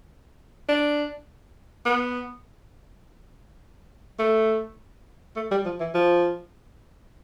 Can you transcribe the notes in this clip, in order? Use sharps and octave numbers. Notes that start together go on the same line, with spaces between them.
D4
B3
A3
A3
G3
F3
E3
F3